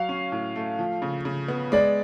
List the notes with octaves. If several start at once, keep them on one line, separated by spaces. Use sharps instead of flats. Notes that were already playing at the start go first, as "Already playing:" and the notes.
Already playing: F#3 F5
C#4
A2
A3
F3
C#3
C#3
B3
G#3 D5